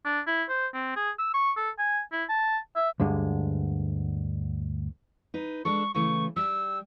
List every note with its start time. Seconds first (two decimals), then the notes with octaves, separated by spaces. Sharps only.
0.05 D4
0.27 E4
0.49 C5
0.74 C4
0.96 G#4
1.19 E6
1.34 C#6
1.57 A4
1.79 G#5
2.12 E4
2.29 A5
2.76 E5
3.00 D2 G2 D3 G#3
5.34 D#4 B4
5.65 G#3 D4 A4 C#6
5.94 C#3 E3 A3 C#6
6.36 G3 E6